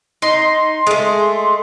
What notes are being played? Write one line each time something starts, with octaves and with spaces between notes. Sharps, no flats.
D#4 C6
G#3 A3